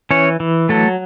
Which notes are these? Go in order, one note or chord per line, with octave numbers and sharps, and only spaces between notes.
E3 C#4 C#5
E3
F#3 A3 A4